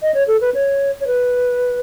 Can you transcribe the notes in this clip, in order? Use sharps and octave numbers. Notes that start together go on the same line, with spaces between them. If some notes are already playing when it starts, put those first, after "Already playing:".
D#5
C#5
A4
B4
C#5
C#5
B4